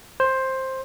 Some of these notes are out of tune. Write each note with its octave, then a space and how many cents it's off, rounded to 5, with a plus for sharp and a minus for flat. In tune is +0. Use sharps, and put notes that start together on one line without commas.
C5 +10